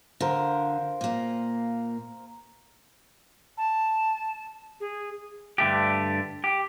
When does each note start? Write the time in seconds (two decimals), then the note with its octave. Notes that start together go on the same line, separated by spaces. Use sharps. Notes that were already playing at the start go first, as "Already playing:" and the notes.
0.20 D3 A#4 C5 F5
1.01 A#2 A#3
3.58 A5
4.80 G#4
5.58 G2 D3 A3 G4
6.44 G4